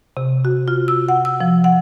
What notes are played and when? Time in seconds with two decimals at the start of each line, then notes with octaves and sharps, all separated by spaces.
0.17 C3
0.45 F#4
0.68 F4
0.88 E6
1.09 F#5
1.25 E6
1.41 F3
1.64 F#5